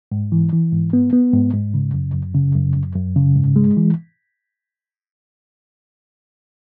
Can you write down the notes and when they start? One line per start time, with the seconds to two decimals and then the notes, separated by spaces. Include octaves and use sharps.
0.12 G#2
0.32 E3
0.52 E3
0.73 G#2
0.93 B3
1.13 B3
1.33 G#2
1.54 G#2
1.74 C#3
1.94 F#2
2.14 F#2
2.35 C#3
2.55 F#2
2.76 F#2
2.96 F#2
3.16 C#3
3.36 G#2
3.56 G#3
3.77 E3